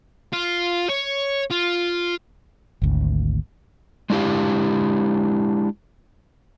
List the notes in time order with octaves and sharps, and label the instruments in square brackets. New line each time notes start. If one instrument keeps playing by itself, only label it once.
[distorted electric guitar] F4
C#5
F4
[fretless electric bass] G#1 D2
[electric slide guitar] G#3 D4 E4 G4 F5